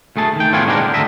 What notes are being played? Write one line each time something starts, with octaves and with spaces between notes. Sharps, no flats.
D2 A3 G#4 A5
D#3 G5
A2 B3 F4 G#4 C#5
G#3 C4 D4 G4 A#4
D3
D2 B2 D3 D#5 E5